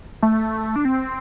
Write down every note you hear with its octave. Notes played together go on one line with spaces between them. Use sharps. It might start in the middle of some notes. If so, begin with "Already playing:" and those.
A3
D4
C4